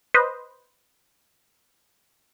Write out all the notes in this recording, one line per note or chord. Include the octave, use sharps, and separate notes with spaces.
B4 C5 D#5